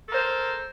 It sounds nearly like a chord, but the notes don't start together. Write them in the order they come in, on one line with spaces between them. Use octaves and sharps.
A4 A#4 C5